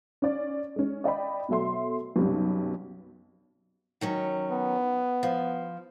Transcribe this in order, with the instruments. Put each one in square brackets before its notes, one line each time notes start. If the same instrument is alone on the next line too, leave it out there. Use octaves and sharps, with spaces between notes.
[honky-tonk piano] C#4 D5
G#3 C#4
D5 D#5 G5 B5
B2 F#3 A3 E5 C6
B1 F#2 C3 G3
[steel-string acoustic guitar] D#3 F#3 C#4
[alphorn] B3
[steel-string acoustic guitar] F3